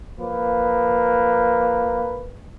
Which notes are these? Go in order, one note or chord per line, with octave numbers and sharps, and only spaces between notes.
F3 A#3 B4